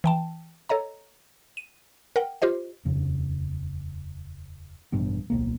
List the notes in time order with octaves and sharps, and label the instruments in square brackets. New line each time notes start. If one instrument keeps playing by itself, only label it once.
[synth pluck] E3 G5 A5
A4 C#5 D#5 A#5
D#7
A#4 F#5 G5
F4 G4 C5 D#5
[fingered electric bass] D#1 F2 C#3
A1 G2 B2 B3
D1 B1 A#3